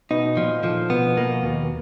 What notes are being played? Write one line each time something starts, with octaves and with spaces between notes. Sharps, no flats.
B2 D#4
A#2 F3
D3 F3
B2 B3
B2 A#3
D#2 B2